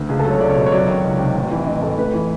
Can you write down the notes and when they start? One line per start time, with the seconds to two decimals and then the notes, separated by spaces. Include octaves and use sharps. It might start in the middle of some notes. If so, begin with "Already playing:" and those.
Already playing: D2
0.09 C#2 G#4
0.19 A4
0.25 F#3
0.31 C#5
0.40 C#2 D5
0.49 C#5
0.56 B2
0.67 C#5
0.72 F#3 D5
0.88 D#3
1.04 C#2
1.19 C3
1.36 A1
1.51 E3
1.66 A1 D#5
1.82 A2 A4
1.98 A1 B4
2.14 E3